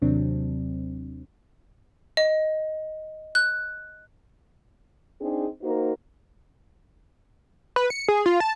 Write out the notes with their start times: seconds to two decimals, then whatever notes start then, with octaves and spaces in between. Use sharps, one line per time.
0.02 D#2 C3 F#3 C4 D4
2.17 D#5
3.35 F#6
5.21 C4 D4 D#4 G#4
5.62 A#3 D#4 F#4 A#4 C5
7.76 B4
7.90 C#7
8.08 G#4
8.26 F4
8.40 A5